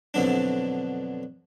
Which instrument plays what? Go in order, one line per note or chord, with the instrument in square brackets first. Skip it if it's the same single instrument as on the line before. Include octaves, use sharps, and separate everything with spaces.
[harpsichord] F2 B2 D3 F#3 D4